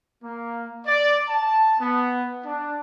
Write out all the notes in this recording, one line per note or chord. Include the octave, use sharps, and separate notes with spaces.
A#3
D5
A5
B3
D4